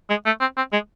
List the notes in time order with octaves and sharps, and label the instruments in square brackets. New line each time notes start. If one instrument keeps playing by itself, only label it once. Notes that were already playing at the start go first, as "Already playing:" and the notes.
[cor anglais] G#3
A3
C4
C4
G#3